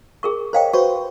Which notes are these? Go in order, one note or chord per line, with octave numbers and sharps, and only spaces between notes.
G#4 A#4 C#6
A#4 C5 C#5 D#5 F5 G5
F#4 B4 C5 C#6